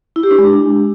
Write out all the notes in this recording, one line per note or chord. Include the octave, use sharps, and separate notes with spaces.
E4
G4
D4
G#3